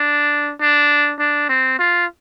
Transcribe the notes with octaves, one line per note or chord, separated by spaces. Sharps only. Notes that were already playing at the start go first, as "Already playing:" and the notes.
Already playing: D4
D4
D4
C4
F4